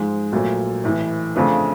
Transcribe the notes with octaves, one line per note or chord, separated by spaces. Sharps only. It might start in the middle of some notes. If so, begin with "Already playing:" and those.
Already playing: G#2 F3 G#3
A#1 A#2 F#3 A3
A1 A2 E3
F2 C#3 F3 A3 D4